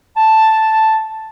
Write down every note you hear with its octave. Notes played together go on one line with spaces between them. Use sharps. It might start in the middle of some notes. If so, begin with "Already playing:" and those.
A5